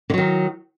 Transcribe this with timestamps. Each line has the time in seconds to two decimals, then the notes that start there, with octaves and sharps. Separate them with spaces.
0.10 D3
0.14 F#3
0.18 D#3